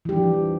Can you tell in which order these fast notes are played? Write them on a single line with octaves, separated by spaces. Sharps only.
E3 G4 D4 F3